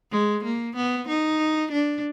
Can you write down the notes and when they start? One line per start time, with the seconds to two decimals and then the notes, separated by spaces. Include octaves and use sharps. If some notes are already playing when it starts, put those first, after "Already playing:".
0.11 G#3
0.44 A#3
0.76 B3
1.08 D#4
1.72 D4